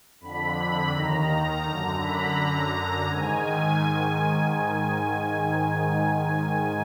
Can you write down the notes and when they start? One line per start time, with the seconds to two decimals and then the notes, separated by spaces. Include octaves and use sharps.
0.21 F2 D3 B5
0.93 D#2 D#3 A#5
1.64 F#2 D3 A#5
2.01 B5
2.36 F#2 D3 A#5
2.72 A#5
3.07 G#2 D#3 G#5